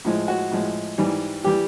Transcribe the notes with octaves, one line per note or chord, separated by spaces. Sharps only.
A2 F3 G#3
F#4
A2 F3 G#3
G#2 E3 G3
E3 G3 G4